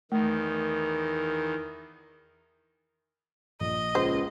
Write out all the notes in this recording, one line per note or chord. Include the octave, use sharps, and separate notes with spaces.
E2 D#3 A3 A#4
A#1 D#5
C#2 C5